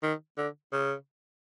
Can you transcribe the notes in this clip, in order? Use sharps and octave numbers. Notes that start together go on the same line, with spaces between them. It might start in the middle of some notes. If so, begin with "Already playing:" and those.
D#3
D3
C#3